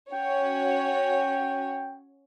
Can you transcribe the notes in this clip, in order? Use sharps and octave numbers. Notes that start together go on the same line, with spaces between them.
C#4 F#4 C#5 G5